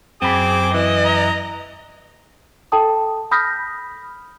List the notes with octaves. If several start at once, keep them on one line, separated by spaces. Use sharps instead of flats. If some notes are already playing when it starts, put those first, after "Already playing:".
F#2 C4 G#4 B5 D6
E3 D#5
A#5
A4 G5 A5 D#6
B5 D#6 F6 G6 A#6 B6